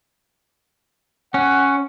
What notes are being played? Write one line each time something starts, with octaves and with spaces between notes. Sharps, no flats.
C#4 F#5